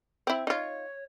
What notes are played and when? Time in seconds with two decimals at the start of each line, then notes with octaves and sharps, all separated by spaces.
0.27 C4 E4
0.47 D#4 F4 C#5